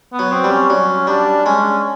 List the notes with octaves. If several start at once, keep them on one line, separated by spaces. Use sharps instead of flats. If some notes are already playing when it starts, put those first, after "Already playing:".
B3
F#3
C4
G3
C#4
F#3 C#4
G3 D4
G#3 C#4